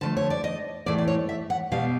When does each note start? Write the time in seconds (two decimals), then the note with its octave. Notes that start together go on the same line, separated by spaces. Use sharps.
0.01 D3 F3 A3 A5
0.17 C#5
0.30 D5
0.44 D#5
0.86 A2 E3 A3 D5
0.98 D5
1.08 C#5
1.29 E5
1.50 F#5
1.72 B2 G3 B3 F5